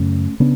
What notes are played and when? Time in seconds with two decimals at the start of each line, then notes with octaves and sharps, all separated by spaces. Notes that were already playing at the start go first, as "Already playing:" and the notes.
Already playing: F#2 C#3 A3 C#4
0.40 C#3 B3 D4